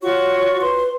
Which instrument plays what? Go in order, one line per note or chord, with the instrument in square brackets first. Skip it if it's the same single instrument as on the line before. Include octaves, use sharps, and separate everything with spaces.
[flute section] F4 F#4 C#6 [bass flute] C#5
[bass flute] B4 [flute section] C6